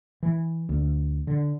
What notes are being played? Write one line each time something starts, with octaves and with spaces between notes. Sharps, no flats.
E3
D2
D3